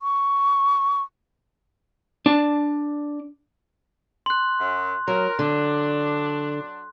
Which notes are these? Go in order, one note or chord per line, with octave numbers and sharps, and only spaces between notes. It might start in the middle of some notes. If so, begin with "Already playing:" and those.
C#6
D4 A5
C6 F#6
F#2
F#3 A#4
D3 F#3 D4